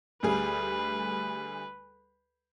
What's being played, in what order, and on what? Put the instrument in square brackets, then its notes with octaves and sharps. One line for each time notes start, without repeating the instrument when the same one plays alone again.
[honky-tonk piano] D2 G3 G#4 [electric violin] B4